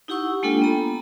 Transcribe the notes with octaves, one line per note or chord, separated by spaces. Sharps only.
D#4 E4 G4 F#5 C#6 E6
G#3 A#3 D4 F4 A4 G5
B3 A#5